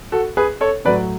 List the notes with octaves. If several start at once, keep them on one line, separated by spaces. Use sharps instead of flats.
F#4 A4
G#4 B4
A4 C#5
A2 F#3 B4 D5